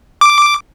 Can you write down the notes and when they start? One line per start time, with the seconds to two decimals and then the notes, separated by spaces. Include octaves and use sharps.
0.21 D6